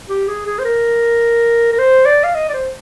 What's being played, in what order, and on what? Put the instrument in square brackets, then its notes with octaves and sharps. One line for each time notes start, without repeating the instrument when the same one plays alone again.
[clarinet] G4
G#4
G#4
C5
A#4
A#4
C5
D5
F5
D#5
D5
C5